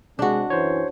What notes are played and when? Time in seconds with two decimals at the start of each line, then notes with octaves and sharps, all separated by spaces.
0.19 C3 G#3 D4 F#4
0.50 F#2 E3 C5 C#5